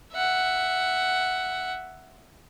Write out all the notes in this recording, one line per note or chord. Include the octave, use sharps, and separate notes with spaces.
E5 F#5